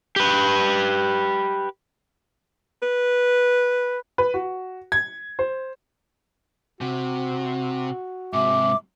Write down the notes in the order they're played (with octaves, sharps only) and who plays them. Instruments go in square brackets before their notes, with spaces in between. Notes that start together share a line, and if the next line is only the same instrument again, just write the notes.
[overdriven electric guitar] G4 B4
[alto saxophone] B4
[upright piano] B4
F#4
G#6
C5
[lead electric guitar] C3 [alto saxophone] F#4
[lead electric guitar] G#2 C3 [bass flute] E5 [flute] D6